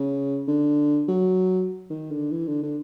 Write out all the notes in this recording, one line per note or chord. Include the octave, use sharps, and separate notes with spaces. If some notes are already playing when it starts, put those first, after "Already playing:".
Already playing: C#3
D3
F#3
D#3
D3
E3
D3
D3